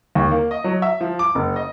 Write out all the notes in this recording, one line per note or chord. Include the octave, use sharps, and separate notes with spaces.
D#2
A#3
D#5
F#3
E5
F3
D6
F#1
D#5